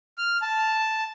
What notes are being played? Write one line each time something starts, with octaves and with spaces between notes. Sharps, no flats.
F6
A5